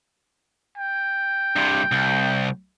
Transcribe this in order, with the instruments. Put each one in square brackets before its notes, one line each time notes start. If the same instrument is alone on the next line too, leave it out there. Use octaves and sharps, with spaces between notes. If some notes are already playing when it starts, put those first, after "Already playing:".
[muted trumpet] G5
[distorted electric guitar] G2 C3
C2